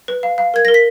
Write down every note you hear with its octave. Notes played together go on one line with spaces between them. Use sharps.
B4
F5
F5
A#4 G#6
A#4 A#6
B6